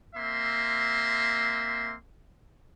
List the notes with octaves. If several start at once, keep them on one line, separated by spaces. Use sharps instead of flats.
A#3 C4 E5 C6